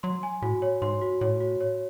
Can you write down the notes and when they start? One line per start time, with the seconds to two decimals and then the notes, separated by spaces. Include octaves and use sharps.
0.03 F#3 C6
0.23 G#5
0.42 A2 F#4
0.62 C#5
0.82 G#2 C6
1.01 F#4
1.21 A2 C#5
1.40 F#4
1.61 C#5